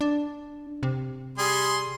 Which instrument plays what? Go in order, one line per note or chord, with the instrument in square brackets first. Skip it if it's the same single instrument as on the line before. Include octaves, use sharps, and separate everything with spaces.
[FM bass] D4
C3
[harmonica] G3 G#4 C6